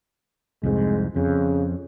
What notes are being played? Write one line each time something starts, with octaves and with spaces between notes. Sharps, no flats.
C2 F2 G#2 G#3
F2 C#3